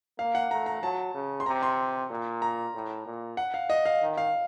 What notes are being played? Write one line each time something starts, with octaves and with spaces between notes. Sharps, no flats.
A#3 F5
F#5
A3 A#5
A#5
F#3 A5
C#3
C6
C3 A#5
C6
A#2
A#5
A2
A#2
F#5
F5
D#5
F5
D#3
F5